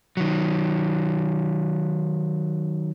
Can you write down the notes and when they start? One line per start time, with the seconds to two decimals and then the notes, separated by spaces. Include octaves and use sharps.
0.17 D#3 F#3